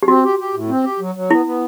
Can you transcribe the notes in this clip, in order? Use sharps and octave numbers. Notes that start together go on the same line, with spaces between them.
G4
C4 F#4
G4
G4
A2
C4
G4
F#3
F#3
B3 E4
B3